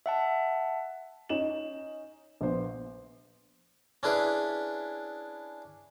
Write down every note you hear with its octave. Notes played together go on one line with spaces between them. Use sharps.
E5 F#5 A5
C#4 D#4 E7 F#7
A#1 B3 C5
C#4 D4 E4 G#4 B4 D5